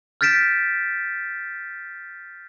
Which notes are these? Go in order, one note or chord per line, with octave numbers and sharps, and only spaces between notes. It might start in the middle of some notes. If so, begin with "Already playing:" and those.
F6 G6 A6 B6 D7 E7